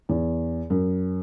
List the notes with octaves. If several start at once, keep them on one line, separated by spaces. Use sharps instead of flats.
E2
F#2